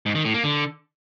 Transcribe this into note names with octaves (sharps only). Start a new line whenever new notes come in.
G#2
D#3
A2
A#3
D3